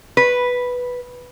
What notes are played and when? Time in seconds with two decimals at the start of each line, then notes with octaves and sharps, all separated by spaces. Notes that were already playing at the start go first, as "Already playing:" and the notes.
0.17 B4